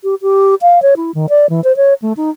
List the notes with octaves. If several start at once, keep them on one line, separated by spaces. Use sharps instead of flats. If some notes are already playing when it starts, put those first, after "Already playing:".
G4
G4
F5
C#5
E4
D#3
D5
E3
C5
C#5
A3
D#4